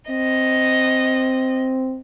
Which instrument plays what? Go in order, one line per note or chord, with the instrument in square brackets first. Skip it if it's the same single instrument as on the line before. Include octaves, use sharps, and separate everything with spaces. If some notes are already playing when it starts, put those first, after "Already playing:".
[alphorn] C4 [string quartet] D#5